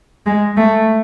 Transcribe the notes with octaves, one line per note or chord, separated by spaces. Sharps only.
G#3
A3